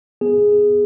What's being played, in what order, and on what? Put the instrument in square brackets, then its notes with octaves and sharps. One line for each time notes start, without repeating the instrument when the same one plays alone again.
[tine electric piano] B3 G#4